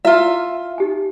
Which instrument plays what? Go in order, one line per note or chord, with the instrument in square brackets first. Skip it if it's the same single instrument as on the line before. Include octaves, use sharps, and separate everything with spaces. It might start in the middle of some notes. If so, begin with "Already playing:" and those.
[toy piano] E4 [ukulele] F4 E5
[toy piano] D#4 G4 G#5